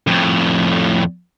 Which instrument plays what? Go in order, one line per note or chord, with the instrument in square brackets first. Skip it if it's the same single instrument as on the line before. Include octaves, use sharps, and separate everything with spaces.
[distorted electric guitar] F2 A2